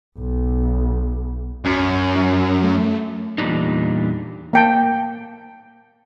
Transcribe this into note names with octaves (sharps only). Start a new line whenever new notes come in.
B1
F#2
F#3
A3
E2 A#2 F3 G3 D4 D#4
A#3 G5 A5